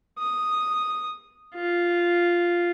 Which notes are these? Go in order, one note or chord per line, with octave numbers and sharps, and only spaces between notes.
D#6
F4